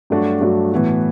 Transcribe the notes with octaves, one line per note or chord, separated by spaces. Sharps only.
G2 F#3 A3 D4 F#4
G2 F#3 A3 D4 F#4
A2 E3 B3 F#4